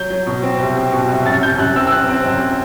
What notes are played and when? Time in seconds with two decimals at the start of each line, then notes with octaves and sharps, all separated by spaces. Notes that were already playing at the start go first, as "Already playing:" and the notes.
Already playing: F#3 G6
0.10 F#3
0.27 B2
0.43 C4
0.59 C2
0.76 C4
0.92 B2
1.09 C2
1.26 F#2 A6
1.42 F#2 G6
1.58 F#2 F#6
1.76 C4 E6
1.87 E6
1.92 C4 F#6
2.09 C4
2.26 F#2